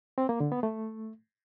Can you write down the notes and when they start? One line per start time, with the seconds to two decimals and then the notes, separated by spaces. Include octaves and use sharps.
0.18 C4
0.29 A#3
0.40 D3
0.52 B3
0.63 A3